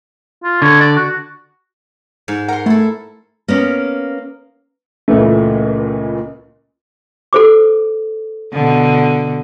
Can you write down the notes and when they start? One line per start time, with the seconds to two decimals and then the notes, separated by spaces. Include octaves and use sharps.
0.44 F4
0.62 D3 C#5
0.81 D5
0.96 F#4
2.28 G#2
2.48 A#4 F#5 C6
2.66 A3 E4 A4
3.48 A#3 B3 C#4
5.08 C#2 A#2 C#3 E3 A3
7.33 A4 C5 D6
8.53 B2 D3